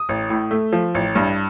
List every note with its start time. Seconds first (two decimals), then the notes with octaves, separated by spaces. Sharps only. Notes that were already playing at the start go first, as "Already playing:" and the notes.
Already playing: D#6
0.09 A1
0.30 A2
0.51 A3
0.73 F3
0.95 A1
1.15 G2